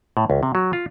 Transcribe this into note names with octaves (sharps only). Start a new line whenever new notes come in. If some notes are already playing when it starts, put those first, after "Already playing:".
A2
C#2
C3
F#3
F4